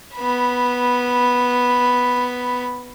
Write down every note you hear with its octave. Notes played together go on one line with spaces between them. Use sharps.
B3 B5